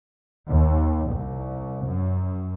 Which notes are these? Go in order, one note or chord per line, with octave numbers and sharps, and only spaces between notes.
D#2
C2
F#2